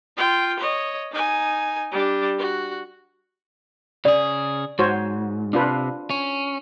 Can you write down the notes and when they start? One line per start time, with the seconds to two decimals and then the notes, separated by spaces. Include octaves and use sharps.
0.17 F4 G5
0.59 C#5 D#5
1.12 D#4 G#5
1.92 G3 D4
2.39 F#4
4.05 C#3 G#4 D5
4.79 G#2 F#4 C5 C#5
5.53 C3 D4 F4 B4
6.10 C#4